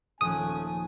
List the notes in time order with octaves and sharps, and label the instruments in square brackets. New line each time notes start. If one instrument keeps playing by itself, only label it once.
[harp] D#1 F3 F#6 [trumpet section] A3 C#4 G#5 [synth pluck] D#6